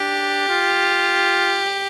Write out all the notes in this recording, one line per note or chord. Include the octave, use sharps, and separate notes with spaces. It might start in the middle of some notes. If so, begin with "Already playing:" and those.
Already playing: D4 G4
F4